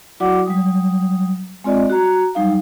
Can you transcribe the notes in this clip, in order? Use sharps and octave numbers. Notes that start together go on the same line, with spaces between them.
F#3 E4 F#4 D5 F#5 D6
F#3 G3 D#6
G#3 C4 F4 D5 D#5
F#4 A#5
F#3 G3 D#4 F5